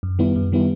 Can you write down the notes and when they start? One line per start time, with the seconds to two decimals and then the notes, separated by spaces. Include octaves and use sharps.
0.03 F#2
0.19 D#3 G3 B3 E4
0.36 F#2
0.52 D#3 G3 B3 E4